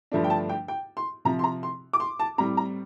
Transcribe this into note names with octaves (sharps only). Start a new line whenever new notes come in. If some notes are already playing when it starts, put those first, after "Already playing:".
G2 D3 F3 A3 D4
G5
A5
G5
G5
C6
C3 F3 C4 A#5
C6
A#5
C6
D6
C6
A5
A2 G3 C4 A#5
A#5